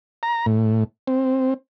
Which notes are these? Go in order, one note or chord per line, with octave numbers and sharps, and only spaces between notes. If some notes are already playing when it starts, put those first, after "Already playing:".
A#5
A2
C4